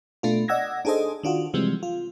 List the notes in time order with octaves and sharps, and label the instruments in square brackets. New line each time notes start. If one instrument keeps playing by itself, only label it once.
[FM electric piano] B2 A3 D4 F4
D5 D#5 F#5 E6 G#6 A#6
D4 D#4 G#4 A4 C5 D#5
D#3 D4 F4 F#4
C3 E3 F3 G3 G#3 C4
F4